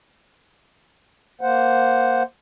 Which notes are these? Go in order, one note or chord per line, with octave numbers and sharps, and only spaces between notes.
A#3 C5 F#5